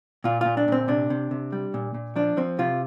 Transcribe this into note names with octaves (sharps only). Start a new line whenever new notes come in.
A#2 F4
A#2 F4
D4
A#2 C4
C3 D4
C3
C3
G3
A#2
A#2
F3 D4
F3 C4
C3 F4